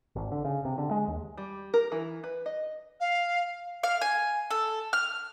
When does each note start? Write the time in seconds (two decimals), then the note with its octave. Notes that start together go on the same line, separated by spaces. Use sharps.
0.16 G#1
0.32 D3
0.45 C#3
0.65 C3
0.78 D3
0.91 G#3
1.08 D#2
1.37 G3
1.74 A#4
1.92 E3
2.24 B4
2.46 D#5
3.00 F5
3.83 F5
4.01 G#5
4.51 A4
4.93 F6